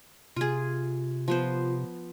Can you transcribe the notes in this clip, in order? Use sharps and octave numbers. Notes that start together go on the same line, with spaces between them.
C3 F4 G#4
F3 B3 C5